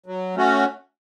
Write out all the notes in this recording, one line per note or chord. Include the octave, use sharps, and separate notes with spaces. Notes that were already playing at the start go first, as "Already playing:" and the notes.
F#3
A3 C#4 F#4